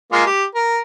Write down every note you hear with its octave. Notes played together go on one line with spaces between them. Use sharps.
G#3 A#3 F4
G4
A#4